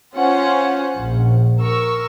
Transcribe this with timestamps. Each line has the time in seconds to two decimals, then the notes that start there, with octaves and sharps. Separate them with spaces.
0.16 C#4 F4 C5 F#5
0.97 A#1
1.60 A#4 C#6 E6